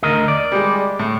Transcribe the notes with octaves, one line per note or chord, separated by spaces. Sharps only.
D2 A#4 D#5
D5
G3 G#3
A2